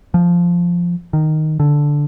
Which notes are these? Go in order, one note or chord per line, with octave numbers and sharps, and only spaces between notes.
F3
D#3
D3